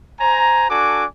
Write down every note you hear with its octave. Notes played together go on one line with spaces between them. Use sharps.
C5 G#5 A#5
D4 F#4 A4 G#5 D6